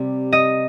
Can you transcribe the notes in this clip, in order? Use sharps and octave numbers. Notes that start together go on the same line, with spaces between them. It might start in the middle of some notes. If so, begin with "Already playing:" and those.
Already playing: C3 G3 C4
D#5